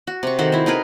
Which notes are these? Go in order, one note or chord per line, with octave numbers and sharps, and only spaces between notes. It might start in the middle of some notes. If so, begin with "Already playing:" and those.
F#4
C3 C#6
D#3 F#4 A4 C5
E4 C5
D#4 G#4 A#4 B4